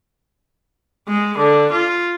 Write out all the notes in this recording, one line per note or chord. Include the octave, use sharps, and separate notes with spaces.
G#3
D3
F4